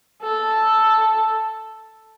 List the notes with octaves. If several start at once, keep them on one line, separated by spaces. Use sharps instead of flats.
A4